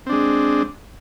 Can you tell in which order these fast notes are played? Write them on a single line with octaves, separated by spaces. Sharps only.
C4 D4 G#3